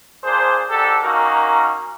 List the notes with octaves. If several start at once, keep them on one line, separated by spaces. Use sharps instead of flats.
A#2 D4 G#4 C5
G#2 D4 G4 A4
A#3 C#4 D#4 F#4 A#4